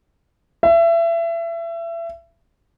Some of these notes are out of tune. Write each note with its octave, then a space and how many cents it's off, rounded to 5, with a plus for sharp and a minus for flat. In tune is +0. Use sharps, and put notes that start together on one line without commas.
E5 +30